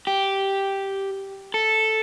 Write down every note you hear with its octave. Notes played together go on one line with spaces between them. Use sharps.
G4
A4